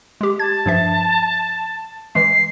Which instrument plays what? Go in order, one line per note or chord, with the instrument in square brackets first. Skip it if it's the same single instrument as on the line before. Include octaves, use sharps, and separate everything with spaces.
[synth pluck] G#3 G4
[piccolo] A5 [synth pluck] G#6
[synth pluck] G2 F3 E5
[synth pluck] E3 G#3 [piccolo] C7